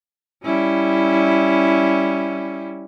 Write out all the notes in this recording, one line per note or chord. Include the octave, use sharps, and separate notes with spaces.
G3 C#4 E4